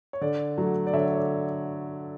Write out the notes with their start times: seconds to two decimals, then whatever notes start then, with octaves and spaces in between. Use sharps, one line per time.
0.13 C#5
0.21 D3 D5
0.58 F#3 A3
0.87 D5
0.94 D3 C#5 E5
1.08 C#5
1.17 D5